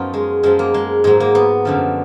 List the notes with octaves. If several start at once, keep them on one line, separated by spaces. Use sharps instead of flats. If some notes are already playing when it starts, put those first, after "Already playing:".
Already playing: F#2 F3 B3 D#4 F4
G#3
F#2 F3 G#3
A#3
G#3
G#2 F#3 G#3
A#3
B3
F#2 D3 F3